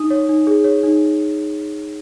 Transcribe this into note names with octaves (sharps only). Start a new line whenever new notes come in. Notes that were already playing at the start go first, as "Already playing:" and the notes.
Already playing: D#4 D#6
C#5
D#4
G#4
C#5
D#4